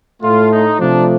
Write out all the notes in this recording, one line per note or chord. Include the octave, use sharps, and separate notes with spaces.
A2 A3 F4
D#4
C3 F3 A3 D4